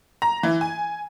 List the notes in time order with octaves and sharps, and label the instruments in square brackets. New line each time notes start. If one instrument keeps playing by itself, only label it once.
[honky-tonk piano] A#5
E3
G#5